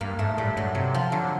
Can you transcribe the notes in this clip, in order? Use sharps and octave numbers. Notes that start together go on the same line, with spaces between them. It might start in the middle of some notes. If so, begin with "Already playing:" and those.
G2 A#3
G#2 A3
A2 G3
G2 F#3
C3 F#3
F3
D3 F#3